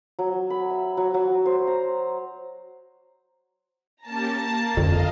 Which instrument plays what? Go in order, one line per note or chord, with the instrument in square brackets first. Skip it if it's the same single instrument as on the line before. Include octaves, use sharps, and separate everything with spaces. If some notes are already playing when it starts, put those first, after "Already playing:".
[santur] F#3
B5
E5
F#3
F#3
C5
A#5
[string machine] A#3 C#4 G4 [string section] A5 A#5
[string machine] A#3
[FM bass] F2 [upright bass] D3 [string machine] D#5 F5